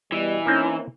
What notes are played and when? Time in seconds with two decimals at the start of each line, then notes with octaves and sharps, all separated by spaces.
0.12 B2 E3 G3 D#5
0.46 A#3 C4 C#4 D#4 E4